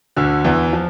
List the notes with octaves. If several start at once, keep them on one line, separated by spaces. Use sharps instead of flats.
D2 D3
E2 E3
F3